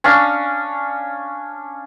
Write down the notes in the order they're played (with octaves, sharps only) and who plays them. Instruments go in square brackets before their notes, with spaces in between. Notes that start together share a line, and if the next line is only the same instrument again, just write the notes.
[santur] C#4 D4 F5